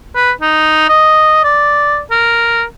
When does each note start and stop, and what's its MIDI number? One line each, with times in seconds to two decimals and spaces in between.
0.15 0.32 71
0.41 0.86 63
0.89 1.44 75
1.44 2.00 74
2.11 2.64 70